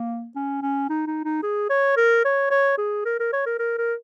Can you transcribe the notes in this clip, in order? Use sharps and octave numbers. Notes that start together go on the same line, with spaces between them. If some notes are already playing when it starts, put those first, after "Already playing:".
Already playing: A#3
C#4
C#4
D#4
D#4
D#4
G#4
C#5
A#4
C#5
C#5
G#4
A#4
A#4
C#5
A#4
A#4
A#4